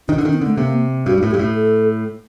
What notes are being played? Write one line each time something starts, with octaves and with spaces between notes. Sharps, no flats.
D#3 D4
D3
D4
D#3
C4
D3 A3
C3 A#3
G2 F#4
G2
A2
G4
G2
A2
A4